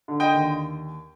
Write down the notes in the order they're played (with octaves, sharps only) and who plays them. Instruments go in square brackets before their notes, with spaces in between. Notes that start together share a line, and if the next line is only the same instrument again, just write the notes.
[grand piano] D3
D#5 G5
D#2